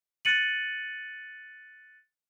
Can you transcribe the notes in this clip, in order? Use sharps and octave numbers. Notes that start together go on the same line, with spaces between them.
F#6 A6 C#7 D#7 F#7